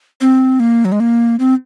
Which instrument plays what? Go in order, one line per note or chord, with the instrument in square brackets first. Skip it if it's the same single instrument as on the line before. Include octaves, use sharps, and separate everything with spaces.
[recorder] C4
A#3
F#3
G#3
A#3
C4